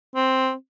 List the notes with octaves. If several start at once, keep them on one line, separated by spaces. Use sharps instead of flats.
C4